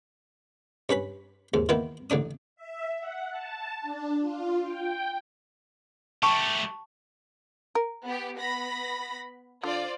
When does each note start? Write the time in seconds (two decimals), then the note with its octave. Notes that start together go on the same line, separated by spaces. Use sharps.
0.89 G2 C#4 B4 B5
1.54 D#2 G#2
1.69 D#3 E3 A#3 B3 E4
2.10 A1 D3 D4 D#6
2.56 E5
2.99 F#5
3.30 A5
3.81 D4
4.20 F4
4.63 G5
6.23 A3 G4 G5 A5 C#6
7.75 A#4
8.05 B3 G4
8.37 B3 B5 A#6
9.64 D3 F4 C5 D5